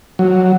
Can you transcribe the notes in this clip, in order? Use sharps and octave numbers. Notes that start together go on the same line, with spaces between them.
F#3